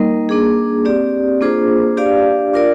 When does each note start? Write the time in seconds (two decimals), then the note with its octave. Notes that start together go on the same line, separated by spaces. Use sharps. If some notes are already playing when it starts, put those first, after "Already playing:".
Already playing: G3 A#3 D#4 A#4 D#5
0.29 A#3 D4 G#4
0.85 C4 G4 D5
1.41 A#3 D4 F4 G#4 C5
1.97 D4 G4 D5 F5
2.54 D4 F4 A#4 D5